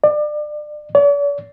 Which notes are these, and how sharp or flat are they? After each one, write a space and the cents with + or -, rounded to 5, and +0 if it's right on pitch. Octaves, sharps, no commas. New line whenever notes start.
D5 +30
D5 -45